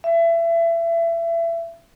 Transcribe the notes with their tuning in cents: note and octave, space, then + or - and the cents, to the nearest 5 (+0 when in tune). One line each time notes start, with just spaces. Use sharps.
E5 +30